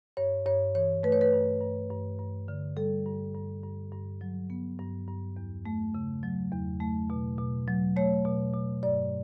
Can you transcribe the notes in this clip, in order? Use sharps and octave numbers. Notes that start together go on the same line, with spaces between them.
G2 C#5
G2 C#5
E3 C#5
A3 B4
C#5
B4
G2
G2
G2
G2
D3
G3 A4
G2
G2
G2
G2
F#3
B3
G2
G2
E2
A3
C#3
F#3
E2
A3
B2
B2
F#3
A3 C#5
B2
B2
G2 D5